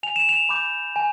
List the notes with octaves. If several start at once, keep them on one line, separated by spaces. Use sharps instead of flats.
G#5 F7
E7
F7
B5 D6 G6
G#5